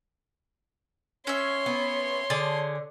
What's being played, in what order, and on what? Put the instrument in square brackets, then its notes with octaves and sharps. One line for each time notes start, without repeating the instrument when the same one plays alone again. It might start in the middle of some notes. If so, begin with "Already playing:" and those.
[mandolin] C#4 E5 [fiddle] C#5 C6
[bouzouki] B3
[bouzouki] D3 [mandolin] G#4 A5